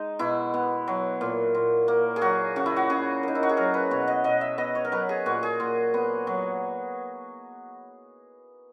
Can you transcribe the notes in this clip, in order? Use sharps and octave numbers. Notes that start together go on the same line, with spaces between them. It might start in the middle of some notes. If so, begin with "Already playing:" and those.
Already playing: G#3 D#4
B2 E4
B3
F#3
A#2
A#2
A#3
G#4
F#3 F#4
C#3 F#4
E4
F#4
C#3 G#4
A#3 D#4
E4
F#4
G#4
F#3 A#4
B4
B2 C#5
D#5
B2 D#5
E5
B3 D#5
C#5
A#4
F#3 B4
G#4
A#2 F#4
G#4
A#2
B3
F#3